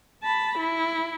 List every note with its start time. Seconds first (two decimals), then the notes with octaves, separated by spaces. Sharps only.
0.23 A5 B5
0.58 E4